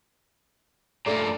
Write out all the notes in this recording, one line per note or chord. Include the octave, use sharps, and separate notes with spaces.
G2 A#2 A3 D5